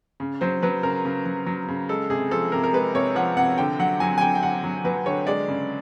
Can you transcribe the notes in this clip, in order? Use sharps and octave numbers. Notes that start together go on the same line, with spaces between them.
C#3
F#3 C5
F#3 B4
C#3 A#4
C#3
F#3
F#3
C#3
G#3 A4
C3 G#4
F3 A4
C3 A#4
A#4
G#3 B4
C3 C#5
F3 F#5
C3 F#5
D3 G5
F#3 F#5
F#3 G#5
G#5
D3 G5
G5
D3 F#5
F#3
F#3 B4
D3 C#5
G#3 D5
C#3